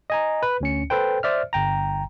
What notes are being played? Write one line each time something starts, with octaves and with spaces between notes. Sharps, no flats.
D#5 G#5 A#5
B4
D2 C#4 C#7
A4 B4 C5 G5
C5 D5 E5 F6
G1 G5 A#5